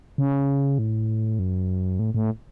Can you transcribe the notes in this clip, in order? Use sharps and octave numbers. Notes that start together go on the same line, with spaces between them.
C#3
A2
F#2
A2
A2